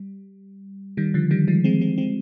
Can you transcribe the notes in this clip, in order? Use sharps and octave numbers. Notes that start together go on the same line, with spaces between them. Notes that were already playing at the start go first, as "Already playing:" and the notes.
Already playing: G3
D#3 G3
D3 F3
D#3 G3
F3 G#3
G#3 C4
G#3 C4
G#3 C4